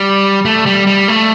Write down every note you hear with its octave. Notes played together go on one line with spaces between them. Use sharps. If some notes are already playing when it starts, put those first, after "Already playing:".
Already playing: G3
A3
G3
G3
A3